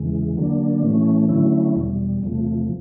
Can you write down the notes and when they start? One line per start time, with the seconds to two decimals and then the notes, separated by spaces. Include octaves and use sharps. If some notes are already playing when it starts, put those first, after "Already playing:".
Already playing: E2 C#3 E3 G#3
0.36 D3 F#3 A#3 D4
0.82 A2 E3 A3 C#4
1.29 D3 F#3 A3 C#4 E4
1.76 E2 B2 G3
2.22 E2 C3 F3 A3